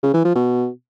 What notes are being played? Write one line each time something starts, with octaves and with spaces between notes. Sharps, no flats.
C#3
E3
F3
B2